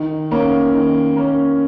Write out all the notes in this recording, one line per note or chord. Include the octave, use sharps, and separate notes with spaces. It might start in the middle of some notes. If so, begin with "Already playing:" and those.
Already playing: D#3
A#3 C#4
D#3
A#3 C#4